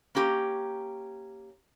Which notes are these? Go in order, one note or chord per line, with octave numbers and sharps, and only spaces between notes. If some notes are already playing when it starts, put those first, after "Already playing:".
A#3 C#4 G4 A#5